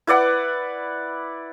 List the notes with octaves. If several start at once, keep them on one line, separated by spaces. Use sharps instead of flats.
E4 B4 D5 F#5